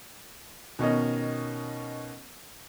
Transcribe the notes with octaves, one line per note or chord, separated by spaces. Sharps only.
B2 D#3 C#4 D#5